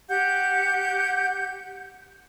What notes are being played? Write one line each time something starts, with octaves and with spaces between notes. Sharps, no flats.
G4 F#5 G6